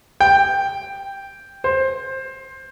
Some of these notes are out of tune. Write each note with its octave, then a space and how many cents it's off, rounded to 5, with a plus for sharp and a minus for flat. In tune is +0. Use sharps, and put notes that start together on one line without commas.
G5 +5
C5 +20